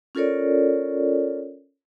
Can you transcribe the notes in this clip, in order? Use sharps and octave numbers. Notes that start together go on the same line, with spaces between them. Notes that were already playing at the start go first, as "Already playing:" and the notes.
C#4 F4 A4 A#4 C#5 D5